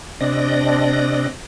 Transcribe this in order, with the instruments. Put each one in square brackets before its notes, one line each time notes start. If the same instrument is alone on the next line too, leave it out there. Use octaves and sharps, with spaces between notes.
[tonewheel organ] C3 C4 D4 D5 D#5 A#6